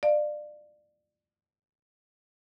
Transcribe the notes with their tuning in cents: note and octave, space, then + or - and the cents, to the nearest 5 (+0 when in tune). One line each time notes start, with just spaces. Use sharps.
D5 +25 F5 +0